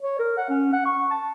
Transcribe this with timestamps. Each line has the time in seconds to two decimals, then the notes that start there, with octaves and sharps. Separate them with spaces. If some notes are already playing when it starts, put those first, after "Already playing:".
0.02 C#5
0.19 A#4
0.38 F#5
0.50 C#4
0.73 F#5
0.86 C#6
1.11 A5